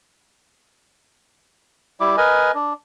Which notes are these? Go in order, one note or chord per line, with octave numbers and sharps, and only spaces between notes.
G3 E4 D6
A#4 B4 D#5 G#5
D4